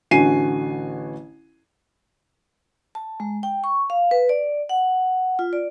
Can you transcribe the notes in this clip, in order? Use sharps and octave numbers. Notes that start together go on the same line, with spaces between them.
A1 D3 F#4 G#5 C7 D#7
A5
G#3
G5
C#6
F5
B4
D5
F#5
F4
D5